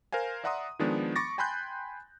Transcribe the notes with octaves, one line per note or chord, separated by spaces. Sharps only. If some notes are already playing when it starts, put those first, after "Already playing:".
A#4 C5 F5 G#5
D5 E5 F#5 A#5 C6 D#6
D#3 F3 G#3 B3 D4
B5 C#6 D6 A6 A#6
G5 G#5 B5 C6 F#6 G6